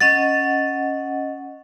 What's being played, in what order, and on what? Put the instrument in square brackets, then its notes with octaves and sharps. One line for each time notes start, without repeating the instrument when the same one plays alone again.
[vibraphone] C#4 D#5 F#5 [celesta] A6